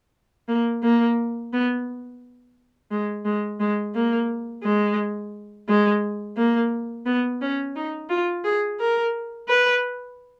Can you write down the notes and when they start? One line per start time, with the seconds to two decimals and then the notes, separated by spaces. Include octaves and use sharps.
0.48 A#3
0.83 A#3
1.53 B3
2.92 G#3
3.25 G#3
3.60 G#3
3.94 A#3
4.64 G#3
5.68 G#3
6.37 A#3
7.06 B3
7.42 C#4
7.76 D#4
8.10 F4
8.44 G#4
8.80 A#4
9.49 B4